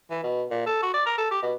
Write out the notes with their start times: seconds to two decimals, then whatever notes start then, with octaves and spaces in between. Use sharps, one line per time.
0.10 E3
0.23 B2
0.51 A#2
0.66 A4
0.82 F#4
0.94 D5
1.06 A#4
1.18 A4
1.31 G4
1.42 B2